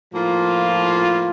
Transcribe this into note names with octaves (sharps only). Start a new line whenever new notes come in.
A2 F3 A#3 F4